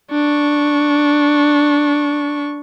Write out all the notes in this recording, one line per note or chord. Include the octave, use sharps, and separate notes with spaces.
D4 C#6